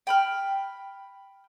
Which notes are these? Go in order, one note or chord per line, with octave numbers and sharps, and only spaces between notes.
G5 B5 F6